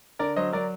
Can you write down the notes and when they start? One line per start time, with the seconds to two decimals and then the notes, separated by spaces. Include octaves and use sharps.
0.19 D3 A#4 D5
0.36 F#3 C5 D#5
0.53 F#3 A#4 D5